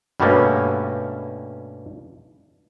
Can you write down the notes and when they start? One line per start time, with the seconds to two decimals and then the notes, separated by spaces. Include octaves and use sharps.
0.20 G2 B2 G3 A3 A#3 C#4